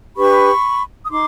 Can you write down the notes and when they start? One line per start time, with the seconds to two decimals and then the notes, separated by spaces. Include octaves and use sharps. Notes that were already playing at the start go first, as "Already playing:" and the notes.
0.17 D4 G4 B4 B5 C#6
1.06 D#6
1.10 D#4 C6 D6